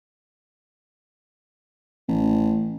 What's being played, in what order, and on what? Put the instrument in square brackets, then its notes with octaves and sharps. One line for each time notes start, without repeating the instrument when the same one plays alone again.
[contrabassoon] A1